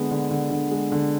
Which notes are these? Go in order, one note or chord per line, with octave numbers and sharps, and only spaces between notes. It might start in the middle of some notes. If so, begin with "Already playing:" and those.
Already playing: D3 G#3 B3
D3
D3
D3
G#3
D3